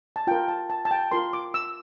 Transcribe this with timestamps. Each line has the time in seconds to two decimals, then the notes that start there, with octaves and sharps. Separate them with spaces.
0.16 A5
0.27 F4 A#4 G5
0.48 A5
0.70 A5
0.85 A5
0.91 G5
1.11 F4 A#4 C6
1.33 D6
1.54 E6